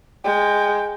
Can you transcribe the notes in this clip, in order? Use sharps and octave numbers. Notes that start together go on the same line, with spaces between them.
G#3 G5